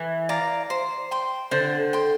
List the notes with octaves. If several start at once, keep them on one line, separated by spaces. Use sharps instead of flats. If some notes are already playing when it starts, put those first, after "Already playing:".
Already playing: E3
D5 F5 A#5
C5
G5 C6
D3 C5
G5 C6